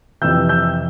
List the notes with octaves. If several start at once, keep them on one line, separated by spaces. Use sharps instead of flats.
F2 C3 E3 E6 G6
E6 G6